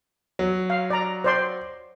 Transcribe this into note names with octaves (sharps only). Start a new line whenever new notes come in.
F#3
F5
D5 A#5
C5 D5 C6